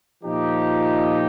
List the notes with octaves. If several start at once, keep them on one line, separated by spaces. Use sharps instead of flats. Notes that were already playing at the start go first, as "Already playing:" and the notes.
A#2 F3 D#4 G4